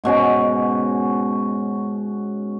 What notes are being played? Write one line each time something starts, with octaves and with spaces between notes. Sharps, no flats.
G#2 B2 C#4 F#4